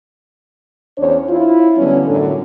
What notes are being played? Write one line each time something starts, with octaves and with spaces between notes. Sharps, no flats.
E2 C#4 D4 C5 C#5
E4 F4
D3 F#3 G3 B3 C#4
F#2 A2 D3 D4 A4